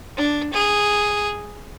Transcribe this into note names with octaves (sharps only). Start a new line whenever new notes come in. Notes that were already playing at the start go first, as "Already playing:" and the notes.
D4
G#4